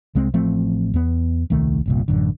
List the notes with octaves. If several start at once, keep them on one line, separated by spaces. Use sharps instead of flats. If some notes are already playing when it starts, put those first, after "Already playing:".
C2 G#3 C4
A1 F3 A3 C4
E2 B3
D#1 C2 D#3 A3
G1 C2 A#2
A1 F#2 D3